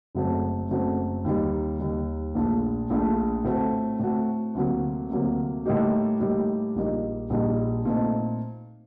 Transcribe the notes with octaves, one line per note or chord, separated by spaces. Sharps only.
F#1 F#2 F#3 A3 C4
F#1 F#2 F#3 A3 C4
D#2 D#3 G3
D#2 D#3 G3
A#1 A#2 A3 D4
A#1 A#2 A3 D4
A2 A3 C4 F#4
A2 A3 C4 F#4
D2 C3 F#3 A#3
D2 C3 F#3 A#3
A2 G3 A#3 D#4 G4
A2 G3 A#3 D#4 G4
A#1 A#2 G3 A#3 D#4
A#1 A#2 G3 A#3 D#4
A#2 A3 C4 D#4